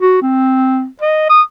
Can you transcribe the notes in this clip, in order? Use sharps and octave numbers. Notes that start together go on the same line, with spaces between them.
F#4
C4
D#5
D#6